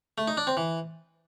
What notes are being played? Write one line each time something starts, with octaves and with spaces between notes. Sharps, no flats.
A3
D#4
D4
C4
E3